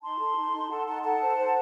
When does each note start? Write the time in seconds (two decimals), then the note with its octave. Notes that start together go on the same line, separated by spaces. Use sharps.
0.02 D#4 A5 C6
0.19 A4
0.36 D#4
0.53 D#4
0.70 A4 F#5 A5
0.86 D#4 F#5 A5
1.03 A4 F#5 A5
1.21 C5
1.38 C5